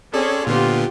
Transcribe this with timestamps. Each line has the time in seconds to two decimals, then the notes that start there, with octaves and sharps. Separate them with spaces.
0.14 C4 C#4 G#4 A4 D5
0.47 A#2 D3 B3 F4 G4